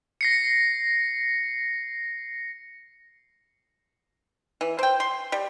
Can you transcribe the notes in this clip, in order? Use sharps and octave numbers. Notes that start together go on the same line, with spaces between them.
A#6 C7 C#7
E3
C5 G5
C6
G3